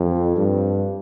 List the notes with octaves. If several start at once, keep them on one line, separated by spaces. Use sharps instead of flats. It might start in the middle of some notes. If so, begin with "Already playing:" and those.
Already playing: F2
G2